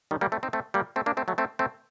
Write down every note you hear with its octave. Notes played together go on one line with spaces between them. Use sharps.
D#3 G3
G3 A#3
A3 C4
C4 D#4
A3 C4
G3 A#3
A3 C4
A#3 D4
A3 C4
F#3 A3
A3 C4
A3 C4